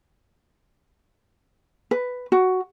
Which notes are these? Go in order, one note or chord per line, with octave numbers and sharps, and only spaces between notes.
B4
F#4